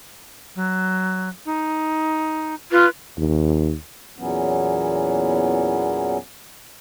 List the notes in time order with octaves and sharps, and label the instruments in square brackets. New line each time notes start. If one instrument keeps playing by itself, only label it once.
[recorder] F#3
D#4
[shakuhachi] F4 [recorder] B4
[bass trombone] D#2
[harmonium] E2 A#2 E3 F#3 B3 C#4